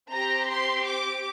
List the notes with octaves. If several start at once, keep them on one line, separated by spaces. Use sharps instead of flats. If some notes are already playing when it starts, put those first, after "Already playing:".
C4 G4 A#5
C6
D6